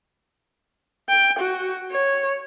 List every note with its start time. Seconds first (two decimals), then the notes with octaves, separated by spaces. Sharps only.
1.09 G5
1.39 F#4
1.91 C#5